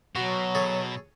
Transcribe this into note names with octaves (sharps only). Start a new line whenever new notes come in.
B2 F#3 F#4
G#4 A4 C#5